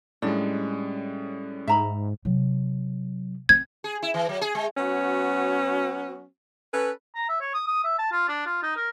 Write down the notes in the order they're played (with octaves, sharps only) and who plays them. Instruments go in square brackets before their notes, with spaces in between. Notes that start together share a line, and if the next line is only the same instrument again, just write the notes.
[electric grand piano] A2 G3 G#3 [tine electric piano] C#4 D5 [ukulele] D4
[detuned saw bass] G#2 [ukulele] E5 A#5 B5
[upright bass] C3 F#3
[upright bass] C4 [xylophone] G#6
[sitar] G#4
E4
E3
F#3
G#4
G#3
[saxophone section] F#3 B3 C#4 F#4
C#4 A4 B4
[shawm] A#5
E5
C#5
D#6
D#6
E5
A5
F4
D4
F4
D#4
A#4